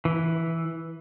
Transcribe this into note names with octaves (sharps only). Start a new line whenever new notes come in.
E3